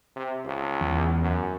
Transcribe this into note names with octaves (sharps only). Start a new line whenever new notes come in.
C3
C#2
E2
F#2